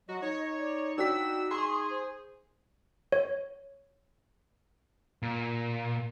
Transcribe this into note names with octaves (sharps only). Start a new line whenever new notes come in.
F#3 F#4 D#5
D#4 C#5
D5
D4 F#4 G5 E6 B6
G#4 C6 C#6
C5
C#5
A#2